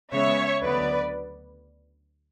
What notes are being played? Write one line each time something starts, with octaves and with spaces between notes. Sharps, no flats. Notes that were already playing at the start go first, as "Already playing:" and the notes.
C#3 G#3 B3 C#5 E5
D2 D3 F#3 B3 B4 D5